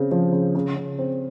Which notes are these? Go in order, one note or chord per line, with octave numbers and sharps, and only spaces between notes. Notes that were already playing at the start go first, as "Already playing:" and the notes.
Already playing: C#3 C4
F3
C#3
C#3
C#3
C4